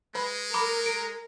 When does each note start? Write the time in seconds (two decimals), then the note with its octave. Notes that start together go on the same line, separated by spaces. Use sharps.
0.15 G#3 B4 B5
0.54 A#4 B5 D6
0.86 D7